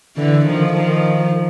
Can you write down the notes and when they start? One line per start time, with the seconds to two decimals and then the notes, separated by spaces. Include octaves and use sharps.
0.17 D3 E3
0.45 D#3 F3
0.73 D#3 F3